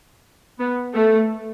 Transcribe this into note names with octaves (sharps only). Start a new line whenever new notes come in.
B3
A3